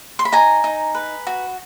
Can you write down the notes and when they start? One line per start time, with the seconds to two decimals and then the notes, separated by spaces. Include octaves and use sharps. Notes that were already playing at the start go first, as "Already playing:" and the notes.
0.19 C6
0.25 B5
0.32 D#4 G#5 A#5
0.64 D#4
0.95 B4
1.27 F#4